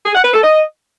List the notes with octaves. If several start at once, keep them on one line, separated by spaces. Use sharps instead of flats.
G#4
F#5
B4
A4
D#5